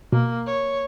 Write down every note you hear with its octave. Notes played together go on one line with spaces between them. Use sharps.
B2 A#3
C#5